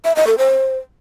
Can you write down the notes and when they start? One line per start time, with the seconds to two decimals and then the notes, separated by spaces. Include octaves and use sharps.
0.05 E5
0.16 D#5
0.27 A4
0.38 C5